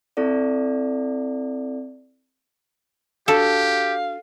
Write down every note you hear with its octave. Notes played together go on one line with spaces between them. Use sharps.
C4 E4 A4 D5
D4 F#4 G4 A4 F5 A5